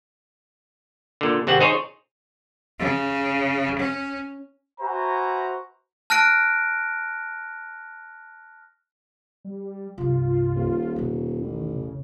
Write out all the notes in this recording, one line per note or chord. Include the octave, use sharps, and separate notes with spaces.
A#2 D3
G#1 C3 C4 F#5
D#4 G#4 C5 C#5
C#3
C#4
F#4 B4 C5 E5 G#5 A#5
A5 F6 F#6 A#6 D7
G3
C2 G2 F4
D#1
E2 B2
A1 D#3
C#3